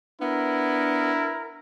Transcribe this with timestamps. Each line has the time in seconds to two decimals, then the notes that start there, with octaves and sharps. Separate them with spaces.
0.22 B3 D4 E4 A#4